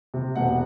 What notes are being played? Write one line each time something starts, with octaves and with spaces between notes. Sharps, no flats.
C3
E1 F#5